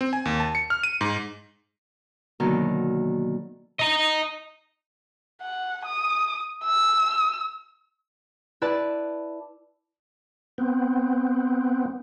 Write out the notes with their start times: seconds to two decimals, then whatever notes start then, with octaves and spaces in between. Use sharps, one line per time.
0.01 C4
0.13 G#5
0.25 D#2
0.40 A5
0.55 C#7
0.70 F6
0.83 D#7
1.01 G#2
2.40 B2 D3 D#3 F#3 A#3 B3
3.79 D#5 A#5
5.42 F#5
5.86 D#6
6.65 E6
8.62 E4 B4 D5 A5
10.58 B3 C4